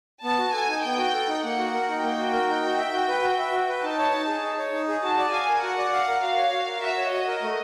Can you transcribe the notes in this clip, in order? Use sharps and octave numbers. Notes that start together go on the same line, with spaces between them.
B3 A5
F#4
A4 G#5
D#4
B3 G5
F#4
A4
D#4
A#3 F#5
F#4
A#4
D#4
A#3 G5
F#4
A#4
D#4
F#4
E5
F#4
B4
F#4
E5
F#4
B4
D#4 A5
C#5
D#4
G#4
D#4
C#5
D#4
G#4
F#4 A5
D5
F5 G#5
A#4
F#4 F#5
D5
F5
A#4
F#4 F5
C#5
F#4
A#4
F#4 E5
C#5
F#4 D#5
A#4
A3